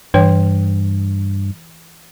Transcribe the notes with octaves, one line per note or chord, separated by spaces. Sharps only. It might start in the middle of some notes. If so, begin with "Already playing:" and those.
G2 E3 C#5 G5